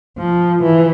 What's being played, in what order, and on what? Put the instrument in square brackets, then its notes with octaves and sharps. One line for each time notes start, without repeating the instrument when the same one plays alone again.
[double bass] F3
E3